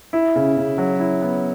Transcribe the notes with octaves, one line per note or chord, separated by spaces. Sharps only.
E4
C#3
C#3
F#3
E4
B3